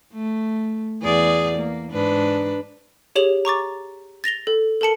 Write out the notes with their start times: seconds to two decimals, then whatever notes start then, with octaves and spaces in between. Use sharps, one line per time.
0.13 A3
1.02 E2 G#4 D5
1.58 A#3
1.91 G#2 D4 B4
3.16 G4 G#4 C#5 F7 F#7
3.45 A#5 C#6 D6 A6
4.24 A6 A#6 F7 G7
4.47 A4
4.81 A4 A#4 A5 C#7 F#7